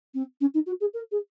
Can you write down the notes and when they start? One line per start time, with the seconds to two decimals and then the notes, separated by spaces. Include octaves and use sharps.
0.14 C4
0.40 C#4
0.53 D#4
0.66 F#4
0.80 G#4
0.93 A#4
1.11 G#4